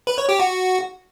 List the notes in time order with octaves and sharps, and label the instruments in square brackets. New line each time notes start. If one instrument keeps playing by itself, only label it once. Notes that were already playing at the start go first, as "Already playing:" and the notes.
[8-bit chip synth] B4
C#5
G4
F#4